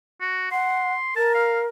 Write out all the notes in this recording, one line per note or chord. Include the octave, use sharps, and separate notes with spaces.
F#4
F#5 C6
A#4 A5
F5